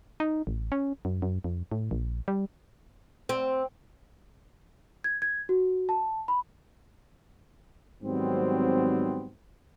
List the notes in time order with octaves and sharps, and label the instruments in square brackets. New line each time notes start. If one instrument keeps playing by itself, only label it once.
[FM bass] D#4
A1
C#4
F#2
F#2
F2
A2
A#1
G3
[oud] C4
[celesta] G#6
G#6
F#4
A5
B5
[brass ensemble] G#2 D#3 F#3 G3 B3 C4